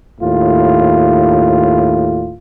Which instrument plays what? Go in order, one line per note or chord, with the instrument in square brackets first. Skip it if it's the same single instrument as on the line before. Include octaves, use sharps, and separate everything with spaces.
[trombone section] D#2 A2 F4